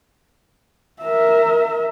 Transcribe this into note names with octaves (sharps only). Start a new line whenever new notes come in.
A#4 E5